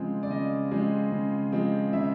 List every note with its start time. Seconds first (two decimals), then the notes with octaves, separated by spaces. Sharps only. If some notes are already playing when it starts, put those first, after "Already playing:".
Already playing: C#3 F3 G#3 C4
0.23 D5
0.30 C#3 D#5
0.71 F3 G#3 C4
1.12 C#3
1.52 F3 G#3 C4
1.93 C#3 E5